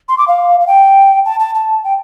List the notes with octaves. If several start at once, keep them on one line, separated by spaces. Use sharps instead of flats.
C6
D6
F5
F5
G5
A5
A5
A5
G5